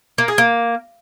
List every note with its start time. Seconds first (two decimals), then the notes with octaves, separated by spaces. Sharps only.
0.18 A#3
0.28 G#4
0.38 A#3